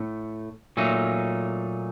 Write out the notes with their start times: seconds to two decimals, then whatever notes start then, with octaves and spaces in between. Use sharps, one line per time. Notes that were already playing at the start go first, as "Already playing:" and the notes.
Already playing: A2 A3
0.77 A#2 F#3 A3 D#4